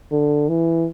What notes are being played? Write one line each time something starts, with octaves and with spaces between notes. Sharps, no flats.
D3
E3